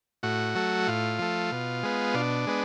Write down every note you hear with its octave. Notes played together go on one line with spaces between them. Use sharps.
A2 F#4
F#3 A3
A2 F4
F3 A3
B2
G#3 B3
B2 D4
G#3 B3